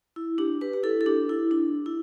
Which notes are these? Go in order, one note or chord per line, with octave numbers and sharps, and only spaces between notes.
E4
D4 G4
G4 B4
G4
E4 A4
A4
D4 G4
E4
D4
E4